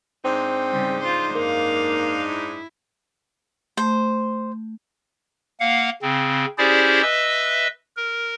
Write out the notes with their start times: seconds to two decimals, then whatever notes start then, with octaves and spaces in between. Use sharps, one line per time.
0.25 G#2 C4 D4 D#4
0.71 C#3 G3
1.00 F4 C5
1.35 F#2 A#3 F5
2.29 E4
3.77 A3 C5
5.60 A#3 F5 F#5
6.02 C#3 C4
6.58 C#4 E4 G4 G#4 C5 D5
7.02 B4 D#5 E5 E6
7.96 A#4